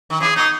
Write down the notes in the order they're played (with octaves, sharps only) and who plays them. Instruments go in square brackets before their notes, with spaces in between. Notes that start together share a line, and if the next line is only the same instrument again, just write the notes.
[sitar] D#3
[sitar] C#3 E3 [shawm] G#4
[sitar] B2 [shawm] D#4